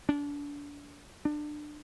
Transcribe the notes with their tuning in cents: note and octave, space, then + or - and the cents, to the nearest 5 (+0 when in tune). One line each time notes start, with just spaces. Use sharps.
D4 -30
D4 +25